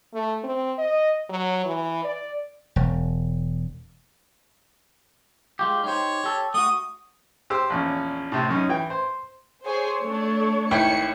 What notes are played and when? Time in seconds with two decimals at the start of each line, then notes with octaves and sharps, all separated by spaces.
0.14 A3
0.44 C4
0.78 D#5
1.29 F#3
1.65 E3
2.04 D5
2.76 E1
5.59 G#3 F4 G4
5.84 D#4 G4 C5 C#5
6.24 G4 A4
6.54 A3 F#4 D#6
7.50 G4 C5 E6
7.70 A#1 E2 C#4
8.32 A2 C3
8.49 F#2 C#4 D#4
8.69 E3 G5
8.90 C5
9.65 G#4 C5 C#5
10.01 A3 D4
10.71 G#1 E4 G5 C#7